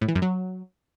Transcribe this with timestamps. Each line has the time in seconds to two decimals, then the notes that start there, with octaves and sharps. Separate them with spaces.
0.01 A2
0.08 E3
0.15 F#2
0.22 F#3